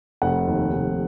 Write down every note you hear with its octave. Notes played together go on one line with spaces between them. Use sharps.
F1 F#5
D#2
F1